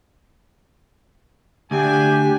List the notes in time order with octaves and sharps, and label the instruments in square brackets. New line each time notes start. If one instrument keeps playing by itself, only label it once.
[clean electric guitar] D2 [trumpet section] D4 G5 G#5 [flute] G4